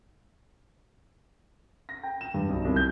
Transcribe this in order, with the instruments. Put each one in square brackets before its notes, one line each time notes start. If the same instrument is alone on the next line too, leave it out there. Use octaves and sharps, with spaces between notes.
[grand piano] A#6
G5
E7
G2
B1
C2
G6